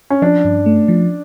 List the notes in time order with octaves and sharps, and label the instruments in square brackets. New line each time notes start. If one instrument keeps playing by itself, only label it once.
[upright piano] C#4
[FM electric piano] F3 [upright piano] D4
[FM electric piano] G2
A3
F3